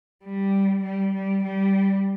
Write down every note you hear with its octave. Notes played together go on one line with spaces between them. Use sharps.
G3
G3
G3
G3